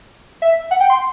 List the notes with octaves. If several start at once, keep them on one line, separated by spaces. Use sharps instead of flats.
E5
F#5
G5
C6